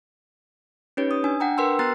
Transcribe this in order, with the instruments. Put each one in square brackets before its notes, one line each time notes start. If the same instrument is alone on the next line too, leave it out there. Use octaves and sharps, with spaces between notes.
[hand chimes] C#4 D#4 G4 B4 C#5
D#6
D4 G#5
D4 F#5 G5 A#5
A#4 B4 G5 C6 E6
B3 F#4 A#5 F#6 A6 C7